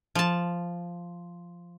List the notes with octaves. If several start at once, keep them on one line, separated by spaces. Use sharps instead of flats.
F3 A5